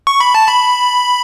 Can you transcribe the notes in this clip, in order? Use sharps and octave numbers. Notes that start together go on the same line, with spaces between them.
C#6
B5
A5
B5